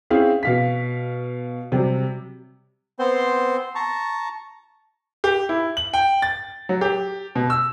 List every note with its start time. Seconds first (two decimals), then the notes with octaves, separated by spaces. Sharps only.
0.10 C4 C#4 E4 G#4 F5
0.43 B2 F5 B6
1.72 C3 F#3 G3 G4
2.99 B3 C4 C5 C6
3.75 A5 A#5 C#6
5.24 G4
5.49 E4
5.77 F#7
5.94 G5
6.22 A6
6.69 F#3
6.81 G4
7.35 B2
7.50 E6